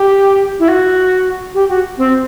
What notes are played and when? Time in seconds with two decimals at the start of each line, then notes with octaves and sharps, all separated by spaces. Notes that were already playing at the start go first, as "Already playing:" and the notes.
Already playing: G4
0.59 E4
0.68 F#4
1.54 G4
1.69 F#4
1.98 C4